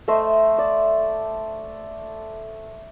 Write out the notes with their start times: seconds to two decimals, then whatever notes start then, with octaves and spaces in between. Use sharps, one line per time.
0.08 A3 C5 D#5 E5
0.58 D5